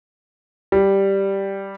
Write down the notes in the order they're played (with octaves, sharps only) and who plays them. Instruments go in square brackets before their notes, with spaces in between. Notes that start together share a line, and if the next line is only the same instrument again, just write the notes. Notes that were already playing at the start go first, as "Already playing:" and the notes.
[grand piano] G3